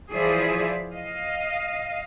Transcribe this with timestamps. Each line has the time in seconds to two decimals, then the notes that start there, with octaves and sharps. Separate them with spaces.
0.11 E3 F3 G#4 C5 D5 E5
0.93 D#5 F5